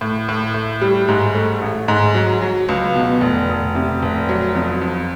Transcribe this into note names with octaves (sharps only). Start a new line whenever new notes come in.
A2
A2
A2
G3
G#2
A3
A1
G#2
F#3
F#3
C#2
B2
F1
F1
C3
F1
F#3
F2
F2